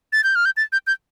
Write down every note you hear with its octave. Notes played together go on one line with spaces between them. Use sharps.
A6
G6
F6
G6
A6
G6
G6